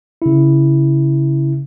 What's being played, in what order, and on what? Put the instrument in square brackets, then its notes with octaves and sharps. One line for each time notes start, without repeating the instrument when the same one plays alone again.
[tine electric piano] C#3 E4